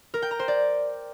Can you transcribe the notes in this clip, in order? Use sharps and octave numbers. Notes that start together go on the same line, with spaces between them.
A#4
G5
A#5
C5
D5